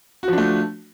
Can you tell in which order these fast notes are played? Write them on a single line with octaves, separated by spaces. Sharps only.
F#4 F3 D4 A3